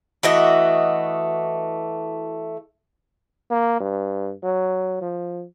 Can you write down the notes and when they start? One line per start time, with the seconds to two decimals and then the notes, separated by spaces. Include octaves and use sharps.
0.23 E3 A3 F#4 D#5
3.50 A#3
3.80 G2
4.43 F#3
5.01 F3